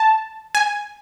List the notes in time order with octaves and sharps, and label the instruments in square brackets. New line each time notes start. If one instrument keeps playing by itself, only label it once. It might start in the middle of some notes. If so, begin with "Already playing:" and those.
Already playing: [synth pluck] A5
G#5